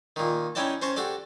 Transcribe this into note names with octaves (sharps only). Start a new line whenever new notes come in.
A#2 D#3
C#4 D#4 E4 D5 G5 A5
C#4 C5 C#5 A5 A#5
F#4 G4 A4 D5